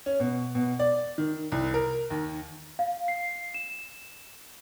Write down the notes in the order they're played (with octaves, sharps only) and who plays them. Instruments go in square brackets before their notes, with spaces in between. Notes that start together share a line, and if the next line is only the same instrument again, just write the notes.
[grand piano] C#4
B2
B2
D5
D#3
C2
A#4
D#2
[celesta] F5
C7
E7